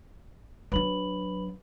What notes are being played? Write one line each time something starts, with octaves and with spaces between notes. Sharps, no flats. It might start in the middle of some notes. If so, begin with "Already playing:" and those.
F#3 D4 B4 B5 F#7